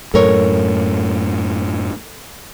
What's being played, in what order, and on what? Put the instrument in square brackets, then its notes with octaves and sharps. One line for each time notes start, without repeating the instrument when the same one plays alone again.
[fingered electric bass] F#2 A2 [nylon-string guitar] A4 A#4 C#5